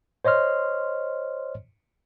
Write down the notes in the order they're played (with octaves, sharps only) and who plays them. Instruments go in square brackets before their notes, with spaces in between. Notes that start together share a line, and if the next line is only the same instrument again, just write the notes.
[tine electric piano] C5 C#5 D#5 C6 F6